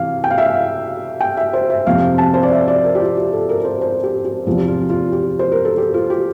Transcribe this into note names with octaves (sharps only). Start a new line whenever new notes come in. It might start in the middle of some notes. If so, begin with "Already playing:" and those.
Already playing: C3 E3 F5
G5
F5
E5
F5
G5
E5
C5
E5
F2 C3 F3 F5
A5
C5
D5
E5
D5
A#4
G4
F4
G4
A4
A#4
A#4
C5
C5
G4
G4
E2 C3 F3 F4
G4
F4
F4
G4
C5
A#4
A4
G4
F4
G4